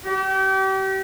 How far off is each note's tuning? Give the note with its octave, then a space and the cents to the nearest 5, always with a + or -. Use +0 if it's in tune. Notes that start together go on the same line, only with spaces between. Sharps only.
G4 -35